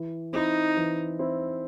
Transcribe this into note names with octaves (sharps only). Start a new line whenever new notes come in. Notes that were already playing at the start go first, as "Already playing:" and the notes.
Already playing: E3
C4 D#4 E4
E3
C4 E4